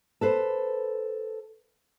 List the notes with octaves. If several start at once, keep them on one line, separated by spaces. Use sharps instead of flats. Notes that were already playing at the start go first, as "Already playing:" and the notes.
A4 B4 C5